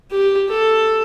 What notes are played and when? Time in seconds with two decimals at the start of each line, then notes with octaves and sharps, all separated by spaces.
0.11 G4
0.50 A4